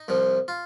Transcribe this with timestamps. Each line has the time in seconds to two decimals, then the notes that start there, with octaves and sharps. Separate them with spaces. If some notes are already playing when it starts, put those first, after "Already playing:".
Already playing: D#4
0.08 C2 C3 F3
0.48 F4